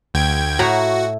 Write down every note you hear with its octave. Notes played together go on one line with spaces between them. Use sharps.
D2 G5 G#6
A2 E4 F#4 A#5